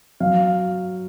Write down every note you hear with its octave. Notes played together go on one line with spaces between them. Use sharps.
F#3 F5